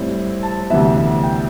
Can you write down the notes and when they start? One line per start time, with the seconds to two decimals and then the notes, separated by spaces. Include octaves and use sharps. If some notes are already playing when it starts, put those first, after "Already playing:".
Already playing: A2 G3 C4 E4
0.43 A5
0.70 D2 C3 E3 B3 E4 E5
0.97 E5
1.23 G5